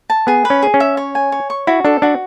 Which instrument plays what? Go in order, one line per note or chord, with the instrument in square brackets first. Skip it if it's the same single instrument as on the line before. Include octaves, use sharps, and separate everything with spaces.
[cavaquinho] A5
[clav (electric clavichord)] B3 [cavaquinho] G#4
[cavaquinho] B4
[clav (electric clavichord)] C#4
[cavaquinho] G#4
[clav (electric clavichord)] C#4
[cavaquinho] E5
C#5
G#5
C#5
C#6
[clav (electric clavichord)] E4 [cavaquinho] F#4
[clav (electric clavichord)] D4 [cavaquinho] A4
[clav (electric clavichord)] D4 [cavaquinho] F#4